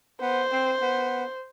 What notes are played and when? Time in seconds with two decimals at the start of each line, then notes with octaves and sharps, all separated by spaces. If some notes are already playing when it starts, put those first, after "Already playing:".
0.22 B3 C5
0.52 C4
0.82 B3